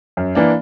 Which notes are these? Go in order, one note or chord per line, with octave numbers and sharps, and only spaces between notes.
F#2
E3 A#3 D4